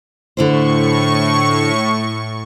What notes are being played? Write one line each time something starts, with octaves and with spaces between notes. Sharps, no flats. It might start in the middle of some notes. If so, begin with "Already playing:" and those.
A2 D3 E4 C5 C#6